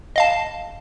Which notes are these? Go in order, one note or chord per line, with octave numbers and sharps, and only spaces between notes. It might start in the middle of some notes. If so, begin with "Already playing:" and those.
D#5 F5 A5